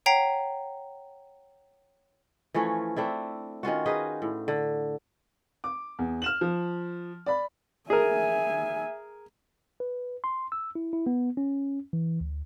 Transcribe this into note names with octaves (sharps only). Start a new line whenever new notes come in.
C#5 F#5 G5 A#5 B6 C7
E3 F3 A3 C#4
A3 C4 D4 E4
D#3 C#4 F4 F#4
D#4 G#4 B4 D#5
A2
D3
D6
E2
F6 E7 F#7
F3
D5 B5
G#4 A#4 E5 G#5
B4
C6
E6
E4
E4
B3
C#4
E3
D2